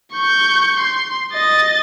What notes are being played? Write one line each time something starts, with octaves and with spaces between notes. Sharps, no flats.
C#6 G6
C6
D#5 A6